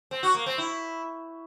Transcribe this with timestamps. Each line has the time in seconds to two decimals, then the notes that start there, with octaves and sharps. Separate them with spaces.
0.11 C4
0.23 F#4
0.35 A#3
0.46 C4
0.58 E4